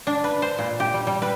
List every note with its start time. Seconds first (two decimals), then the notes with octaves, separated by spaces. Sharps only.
0.07 D4
0.24 B4
0.42 C5
0.58 A#2
0.80 G4
0.94 G3
1.07 G3
1.22 B4